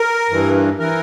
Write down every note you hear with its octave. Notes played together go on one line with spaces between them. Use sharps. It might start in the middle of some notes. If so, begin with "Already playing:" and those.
Already playing: A#4
G2 E3
E3 A#4